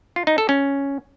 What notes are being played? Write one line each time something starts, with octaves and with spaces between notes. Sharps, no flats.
F4
D#4
A4
C#4